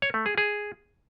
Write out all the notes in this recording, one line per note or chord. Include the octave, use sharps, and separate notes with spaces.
C#5
A3
G#4
G#4